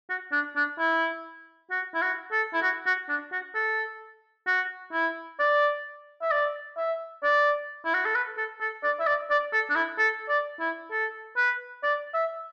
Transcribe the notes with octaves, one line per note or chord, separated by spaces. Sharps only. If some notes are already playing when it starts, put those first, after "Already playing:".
F#4
D4
D4
E4
F#4
E4
F#4
A4
E4
F#4
F#4
D4
F#4
A4
F#4
E4
D5
E5
D5
E5
D5
E4
F#4
A4
B4
A4
A4
D5
E5
D5
D5
A4
D4
E4
A4
D5
E4
A4
B4
D5
E5